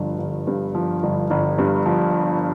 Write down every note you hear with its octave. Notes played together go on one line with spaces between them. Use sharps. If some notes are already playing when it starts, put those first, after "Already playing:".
Already playing: G1 G2 F3
G1
G2
F3
G1
G1
G2
F3